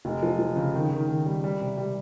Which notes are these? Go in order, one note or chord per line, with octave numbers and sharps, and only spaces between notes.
F1
F3
F3
C#3
D#3
D#3
D#3
G3
G3
C3
G3